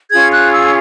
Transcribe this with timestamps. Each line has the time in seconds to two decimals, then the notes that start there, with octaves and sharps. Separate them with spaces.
0.11 C#4 F4 G#4 G#6
0.32 F#6
0.53 E6